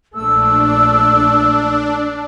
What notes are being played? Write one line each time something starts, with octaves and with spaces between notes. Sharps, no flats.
A#1 A3 D4 E6